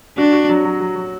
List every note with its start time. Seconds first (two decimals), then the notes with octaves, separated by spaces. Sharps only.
0.18 D4 F#4
0.33 F#4
0.49 F#3
0.65 F#3
0.80 F#3
0.96 F#3